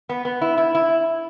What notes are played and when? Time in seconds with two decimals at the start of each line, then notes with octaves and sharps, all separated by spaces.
0.09 B3
0.25 B3
0.41 E4
0.58 E4
0.75 E4